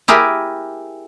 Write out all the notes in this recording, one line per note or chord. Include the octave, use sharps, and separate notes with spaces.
E4 G4 G#4 A#4 E5